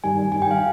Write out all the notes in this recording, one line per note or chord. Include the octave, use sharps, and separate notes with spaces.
G2 D#3 G3 G#5
G2 D#3 G3 G#5
G5
F5